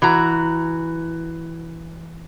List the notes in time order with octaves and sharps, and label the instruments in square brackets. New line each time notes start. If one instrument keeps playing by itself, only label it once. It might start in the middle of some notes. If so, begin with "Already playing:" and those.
[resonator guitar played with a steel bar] E3 F#4 A#5